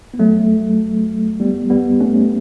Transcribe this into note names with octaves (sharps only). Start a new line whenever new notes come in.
B3
F#3 A3
G3 B3
G3 B3
A3 C#4